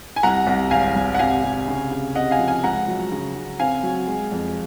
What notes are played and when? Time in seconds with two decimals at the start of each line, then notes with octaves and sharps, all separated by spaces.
0.16 G#5
0.23 C2 F#5 A#5
0.47 C2
0.71 G#1 F5 G#5
0.96 G#1
1.14 F#5
1.19 C3 F5 G#5
1.44 C3
1.68 C#3
1.91 C#3
2.15 C3 D#5 F#5
2.31 F5 G#5
2.39 F3
2.48 F5 G#5
2.63 C#2 F#5 A#5
2.87 F#3
3.12 C#3
3.36 C#3
3.59 C4 F5 G#5
3.83 F#3
4.07 G#3
4.32 F2